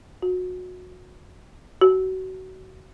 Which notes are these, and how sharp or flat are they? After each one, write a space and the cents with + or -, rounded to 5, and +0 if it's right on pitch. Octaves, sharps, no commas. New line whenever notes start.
F#4 -25
F#4 +25